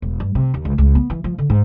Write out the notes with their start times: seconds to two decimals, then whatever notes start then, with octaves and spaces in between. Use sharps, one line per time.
0.02 E1
0.20 G2
0.35 C3
0.54 D#2
0.65 C#2
0.78 C#2
0.95 B3
1.10 E3
1.24 F3
1.38 D3
1.50 G#2